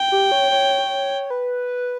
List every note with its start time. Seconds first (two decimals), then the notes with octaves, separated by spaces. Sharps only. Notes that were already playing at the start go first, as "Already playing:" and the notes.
Already playing: G5
0.12 G4
0.32 C#5
0.51 C#5
1.30 B4